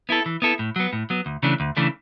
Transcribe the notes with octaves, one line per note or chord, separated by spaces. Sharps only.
B3 E4 A4
E3
B3 E4 A4
A2
F#3 B3
A2
F#3 B3
D2
C#3 E3 A3 D4
D2
C#3 E3 A3 D4